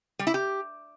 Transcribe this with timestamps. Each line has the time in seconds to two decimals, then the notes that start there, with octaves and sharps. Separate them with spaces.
0.19 G3
0.27 E4
0.34 G4